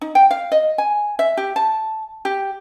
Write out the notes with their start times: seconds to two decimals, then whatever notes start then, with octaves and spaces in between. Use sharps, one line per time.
0.01 D#4
0.15 G5
0.31 F5
0.52 D#5
0.78 G#5
1.19 E5
1.37 G4
1.56 A5
2.25 G4